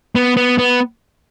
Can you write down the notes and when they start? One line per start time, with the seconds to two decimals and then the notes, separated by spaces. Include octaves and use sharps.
0.15 B3
0.37 B3
0.58 B3